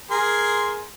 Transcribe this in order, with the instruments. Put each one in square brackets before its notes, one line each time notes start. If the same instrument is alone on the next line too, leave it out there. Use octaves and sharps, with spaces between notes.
[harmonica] G#4 A#4 C6